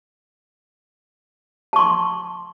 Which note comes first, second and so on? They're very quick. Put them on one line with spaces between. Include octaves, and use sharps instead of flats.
A5 C#6 C6